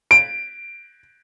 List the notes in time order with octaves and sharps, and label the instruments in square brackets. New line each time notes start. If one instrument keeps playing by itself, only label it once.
[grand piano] D7